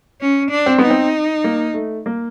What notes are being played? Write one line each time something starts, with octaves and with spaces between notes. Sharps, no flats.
C#4
D4
C4
B3 D#4
C4
A#3
A3
A#3